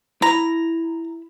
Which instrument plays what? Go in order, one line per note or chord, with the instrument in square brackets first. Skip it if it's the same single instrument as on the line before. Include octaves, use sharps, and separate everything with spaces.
[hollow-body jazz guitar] E4 B5 [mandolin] A#5